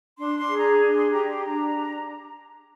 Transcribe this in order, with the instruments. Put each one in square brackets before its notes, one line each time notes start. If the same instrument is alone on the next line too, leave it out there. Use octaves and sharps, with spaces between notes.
[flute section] D4 C6
C6
G#4
A#5
D4
C6
G4 A#5
C6
D4 A#5